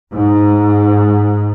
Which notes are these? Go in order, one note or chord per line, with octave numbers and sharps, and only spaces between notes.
G#2